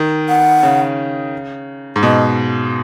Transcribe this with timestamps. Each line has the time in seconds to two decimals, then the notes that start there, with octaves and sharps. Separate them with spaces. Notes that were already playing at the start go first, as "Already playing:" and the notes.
Already playing: D#3
0.29 F#5
0.63 C#3
1.96 G#2
2.03 B2 D#5